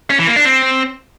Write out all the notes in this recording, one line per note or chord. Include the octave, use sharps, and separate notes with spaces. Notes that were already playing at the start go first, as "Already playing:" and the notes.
C#4
E3
A#3
D4
C4